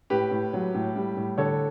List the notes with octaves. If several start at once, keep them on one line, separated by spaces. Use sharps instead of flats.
A2 G4 B4
A2
F#3
A2
G3
A2
D3 A4 C#5